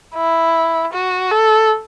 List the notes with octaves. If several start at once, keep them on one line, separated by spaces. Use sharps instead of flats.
E4
F#4
A4